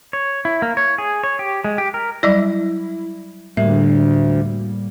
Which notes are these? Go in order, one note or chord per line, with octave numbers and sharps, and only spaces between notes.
C#5
E4
A#3
C#5
G#4
C#5
G4
G#3
G4
A#4
F#3 G3 E4 D5
D2 A2 G3 A#3 E5